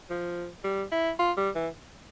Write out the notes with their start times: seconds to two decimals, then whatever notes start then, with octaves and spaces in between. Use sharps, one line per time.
0.10 F3
0.64 G3
0.92 E4
1.19 F4
1.37 G3
1.55 E3